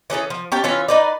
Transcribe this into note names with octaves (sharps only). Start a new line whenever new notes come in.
E3 C#4 G#4 A4
F3
C#4 G4 G5 A5
E3 C#4 F4 E5
D#4 B4 D5